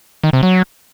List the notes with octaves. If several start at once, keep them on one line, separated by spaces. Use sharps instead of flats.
D#3
C3
F#3